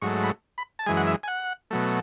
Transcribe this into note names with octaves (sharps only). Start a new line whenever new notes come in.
G#2 F#3 A3 C#6
B5
B5
A5
F#2 E3 G#3 G#5
F#5
E5
G#5
F#5
B2 F#3 A3